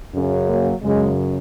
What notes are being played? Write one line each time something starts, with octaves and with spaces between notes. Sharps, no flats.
F#2 C#3
F#3 A#3
F#2 C#3 G#3